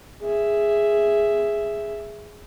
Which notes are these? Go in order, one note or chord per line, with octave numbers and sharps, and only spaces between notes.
G#4 E5